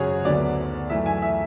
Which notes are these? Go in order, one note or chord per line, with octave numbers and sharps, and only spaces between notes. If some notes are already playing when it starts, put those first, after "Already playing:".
Already playing: G#1 F#2 C#3 F#4 G#4 C#5
D2 D3 F#3 B3 D5
F#2 E3 A3 E5
G#5
E5